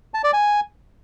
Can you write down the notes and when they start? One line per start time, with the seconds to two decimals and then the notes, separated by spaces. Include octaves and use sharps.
0.14 A5
0.24 D5
0.33 G#5